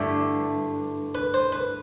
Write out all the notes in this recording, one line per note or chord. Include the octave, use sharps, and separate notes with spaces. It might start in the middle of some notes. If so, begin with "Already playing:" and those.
Already playing: G2 D3 A3 E4 G4
B4
C5
B4